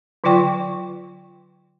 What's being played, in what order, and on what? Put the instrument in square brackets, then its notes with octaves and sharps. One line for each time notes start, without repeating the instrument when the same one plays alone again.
[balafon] D3 F#3 F4 D5 G5 C#6